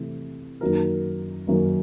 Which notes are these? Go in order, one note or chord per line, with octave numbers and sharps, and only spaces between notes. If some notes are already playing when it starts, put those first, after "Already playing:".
Already playing: C3 E3 A3
F#2 D#3 F#3 A#3 D#4 A#4
F#2 D#3 F#3 A#3 D#4